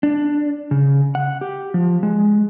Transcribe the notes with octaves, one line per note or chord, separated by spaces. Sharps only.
D4
C#3
F#5
G4
F3
G#3